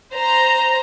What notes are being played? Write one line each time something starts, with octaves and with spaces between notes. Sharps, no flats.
C5 A#5